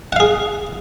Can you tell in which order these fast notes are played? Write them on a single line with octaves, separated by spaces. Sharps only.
F#5 F5 G#4